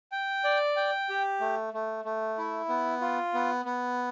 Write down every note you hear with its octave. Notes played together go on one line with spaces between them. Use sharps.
G5
D5
G5
G4
A3
A3
A3
E4
B3
F4
B3
B3